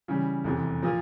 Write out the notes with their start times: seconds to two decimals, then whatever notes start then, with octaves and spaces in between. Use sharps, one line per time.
0.08 C#3 E3 G3
0.44 F1 E2 C3 E3
0.82 A#2 F3 A#3